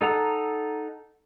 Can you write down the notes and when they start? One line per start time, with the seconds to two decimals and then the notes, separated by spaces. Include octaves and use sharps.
0.01 D#4 A4 F#5 A#5